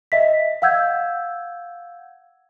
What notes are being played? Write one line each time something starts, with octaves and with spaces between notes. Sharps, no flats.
D#5 E5 B6
F5 F#5 E6 G6 G#6